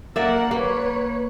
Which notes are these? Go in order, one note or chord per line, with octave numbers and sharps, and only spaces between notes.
A#3 A#4 D5 E5 F#5
A#3 B4 C#5